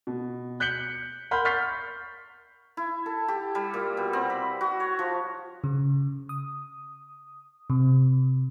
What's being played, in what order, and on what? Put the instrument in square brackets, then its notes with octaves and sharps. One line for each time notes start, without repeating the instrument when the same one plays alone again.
[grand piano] B2
F#6 G6 B6 C#7 F#7 G7
A#4 F#5 B5 C6 F6 G6
C#6 F6 G6 A6 B6 C7
[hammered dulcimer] E4
A4
G4
G3
A#2
B2
C4
B5
F#4
C#5
F3
[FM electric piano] C#3
D#6
C3